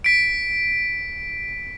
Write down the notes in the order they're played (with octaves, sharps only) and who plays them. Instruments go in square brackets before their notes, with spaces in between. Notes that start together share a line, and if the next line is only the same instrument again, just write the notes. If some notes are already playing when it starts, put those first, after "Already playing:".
[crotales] B6 D7